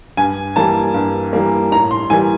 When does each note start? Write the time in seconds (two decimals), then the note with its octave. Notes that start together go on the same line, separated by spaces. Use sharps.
0.17 G2 G#5
0.56 E3 G3 A#3 A5
0.94 G2
1.33 E3 G3 A#3
1.72 A2 A#5
1.91 C6
2.10 E3 G3 A#3 G#5